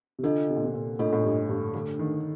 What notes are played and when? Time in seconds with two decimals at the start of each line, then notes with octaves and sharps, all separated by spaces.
0.19 C3
0.23 D3 D4 F4 A4 D#5
0.49 C3
0.56 A#2
0.64 C3
0.73 A#2
0.99 A2 D4 F4 A4 D#5
1.13 A2
1.24 G2
1.49 G2
1.74 D3 A3 D4 A4
1.99 D#3